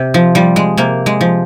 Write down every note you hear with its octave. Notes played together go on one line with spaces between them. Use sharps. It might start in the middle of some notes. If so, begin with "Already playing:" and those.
Already playing: C3
F3
F3 G3
G#3
C3 A#3
G#3
F3